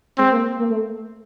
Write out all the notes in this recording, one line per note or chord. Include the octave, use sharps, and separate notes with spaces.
G#3 C4
A#3
A#3
A3